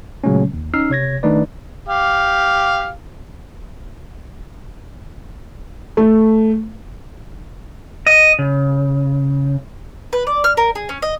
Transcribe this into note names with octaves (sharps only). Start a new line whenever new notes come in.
A#2 C#3 F#3 G#3 A3 C#4
D#2
C#4 D#4 E6 F6 C7
C3 C#5 G#6 A#6
D#3 A3 D4 D#4 B4 D5
G4 F5
A3
D#5
C#3
B4
D5
F6
A#4
G#4
C#4
D#5